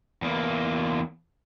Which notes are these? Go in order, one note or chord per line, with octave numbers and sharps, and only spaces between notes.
E2 A#3